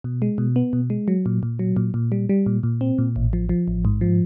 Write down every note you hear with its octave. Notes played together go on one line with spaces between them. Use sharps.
B2
G#3
B2
B3
B2
G#3
F#3
A#2
A#2
F#3
A#2
A#2
G3
G3
A#2
A#2
C4
A#2
A1
F3
F3
A1
G#2
F3